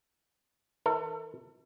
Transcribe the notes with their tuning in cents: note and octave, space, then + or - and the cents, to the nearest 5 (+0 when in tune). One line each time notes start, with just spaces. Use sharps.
E3 -45 A4 +35